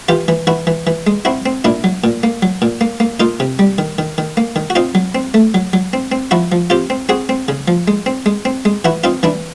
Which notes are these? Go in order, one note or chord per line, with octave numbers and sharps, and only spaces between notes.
E3 F4 G4
E3
E3 E4 F#4
E3
E3
G#3
C4 E4 F#4
C4
A#2 D4 E4
F#3
A#2
A#3
F#3
A#2
A#3
A#3
A#3 D#4 F4
C3
G3
D#3
D#3
D#3
A#3
D#3
F#4
C4 D#4 F4
F#3
C4
A3
F#3
F#3
C4
C4
F3 E4 F#4
F3
C4 F4 G4
C4
C4 F#4 G#4
C4
C#3
F3
G#3
C4
G#3
C4
G#3
E3 E4 F#4
C4 D#4 F4
E3 D4 E4